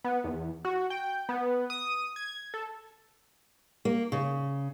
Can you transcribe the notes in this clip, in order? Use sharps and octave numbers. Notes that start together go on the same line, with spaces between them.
B3
E2
F#4
G5
B3
D#6
G#6
A4
A#3
C#3